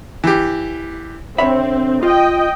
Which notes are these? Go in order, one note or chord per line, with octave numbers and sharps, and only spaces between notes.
E3 G4
D3 C4 C#5 E5 B5
F4 D#5 G5